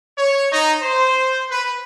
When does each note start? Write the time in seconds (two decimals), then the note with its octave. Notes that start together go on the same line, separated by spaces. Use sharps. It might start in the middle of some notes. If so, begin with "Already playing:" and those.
0.18 C#5
0.52 D#4
0.83 C5
1.51 B4